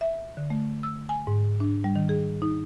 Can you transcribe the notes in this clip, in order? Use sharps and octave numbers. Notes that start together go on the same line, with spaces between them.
E5
D3
A3
E6
G#5
G#2
D4
G3
D#3
G#4
D#4